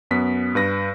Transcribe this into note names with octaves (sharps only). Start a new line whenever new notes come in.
F#2 B3 B6
G2 B4 A#6